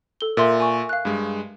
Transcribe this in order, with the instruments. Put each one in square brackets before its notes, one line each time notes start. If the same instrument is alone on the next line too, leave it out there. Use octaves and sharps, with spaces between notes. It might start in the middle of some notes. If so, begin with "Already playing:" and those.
[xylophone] A4 G7
[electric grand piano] A#2 [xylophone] A#4 E5 C6
[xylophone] G#5 C#6
F5 F#6
[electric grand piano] G2 G#3